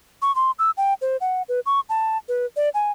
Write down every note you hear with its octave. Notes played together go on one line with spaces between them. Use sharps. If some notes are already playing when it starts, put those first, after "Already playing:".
C#6
C6
E6
G5
C5
F#5
B4
C#6
A5
B4
D5
G#5